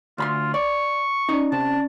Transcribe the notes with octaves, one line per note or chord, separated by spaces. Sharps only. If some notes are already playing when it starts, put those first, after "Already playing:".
D2 F4 B5 C6
D5 C#6
C#4 D#4 D5
C3 A5